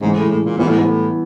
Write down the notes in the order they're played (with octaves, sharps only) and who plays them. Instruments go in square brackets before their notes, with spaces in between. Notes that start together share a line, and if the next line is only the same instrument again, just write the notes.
[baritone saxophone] G#2 [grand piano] C#3 E3 G#3
[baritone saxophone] A2
A2
A#2
[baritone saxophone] A#2 [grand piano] E3 G3 B3 E4
[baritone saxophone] A2
G#2
A2